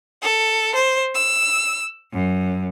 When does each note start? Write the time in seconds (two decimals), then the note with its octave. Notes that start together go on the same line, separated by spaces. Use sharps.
0.23 A4
0.75 C5
1.14 E6
2.13 F#2